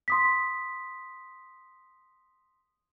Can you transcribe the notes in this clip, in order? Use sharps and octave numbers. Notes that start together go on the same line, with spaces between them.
C6 D#6 B6